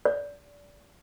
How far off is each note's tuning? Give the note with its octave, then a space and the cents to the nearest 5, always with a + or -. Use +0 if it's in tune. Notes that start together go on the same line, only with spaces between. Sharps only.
D5 -25